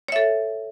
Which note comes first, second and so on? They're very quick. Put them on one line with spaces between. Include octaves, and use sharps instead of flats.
C#5 E5 A4